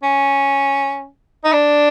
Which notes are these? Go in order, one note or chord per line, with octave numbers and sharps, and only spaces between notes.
C#4
D#4
D4